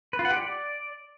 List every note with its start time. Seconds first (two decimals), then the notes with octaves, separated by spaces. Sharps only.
0.13 B4
0.19 F4
0.25 F#5
0.31 G4
0.37 D5